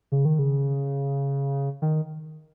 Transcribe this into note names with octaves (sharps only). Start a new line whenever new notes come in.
C#3
D#3
C#3
D#3